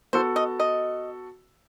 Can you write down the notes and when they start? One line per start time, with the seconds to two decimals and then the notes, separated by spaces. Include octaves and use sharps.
0.13 B3 F#4 A4 C5
0.36 D#5
0.60 D#5